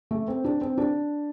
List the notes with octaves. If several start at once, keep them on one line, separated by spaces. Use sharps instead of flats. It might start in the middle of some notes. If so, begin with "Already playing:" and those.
A3
C4
D4
C4
D4